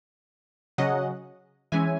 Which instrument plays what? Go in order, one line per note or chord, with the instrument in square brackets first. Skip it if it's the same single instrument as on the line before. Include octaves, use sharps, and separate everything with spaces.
[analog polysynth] C#3 F#3 C#4 D#5 F#5
E3 G#3 C#4 E5 G#5